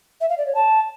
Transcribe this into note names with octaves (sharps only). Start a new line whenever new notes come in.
E5
F5
D5
C#5
A5